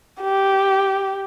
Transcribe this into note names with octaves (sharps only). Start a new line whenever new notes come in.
G4